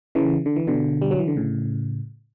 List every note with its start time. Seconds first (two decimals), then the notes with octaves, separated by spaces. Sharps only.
0.15 C#3 E3
0.46 D3
0.56 E3
0.67 B2 D3
1.02 G3
1.11 F#3
1.19 E3
1.28 D3
1.36 A2 C#3